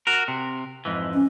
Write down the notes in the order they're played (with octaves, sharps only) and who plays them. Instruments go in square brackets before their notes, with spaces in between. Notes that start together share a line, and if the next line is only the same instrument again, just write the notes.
[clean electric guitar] F#4 A#4
C3
F2 G#2 E3
[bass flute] C#4